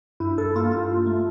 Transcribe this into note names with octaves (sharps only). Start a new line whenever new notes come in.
G2 E4
G2 A4
A#3 F4
G2 F4
G2
A3